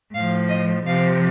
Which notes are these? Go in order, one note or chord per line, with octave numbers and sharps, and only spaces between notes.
A2 F3 F5
D#5
C3 F3 F5